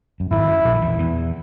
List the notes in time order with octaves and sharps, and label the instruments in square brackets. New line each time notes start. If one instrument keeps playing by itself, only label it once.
[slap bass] F#2
[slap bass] G#1 G#2 [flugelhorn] E4
[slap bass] F#2
A#1 A#2
D#3
E2 E3
E2 E3